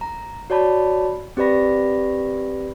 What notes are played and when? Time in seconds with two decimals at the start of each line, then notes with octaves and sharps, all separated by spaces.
0.01 A#5
0.50 F#4 C#5 D5 A5 B5
1.37 C4 G4 B4 D5 B5 A#6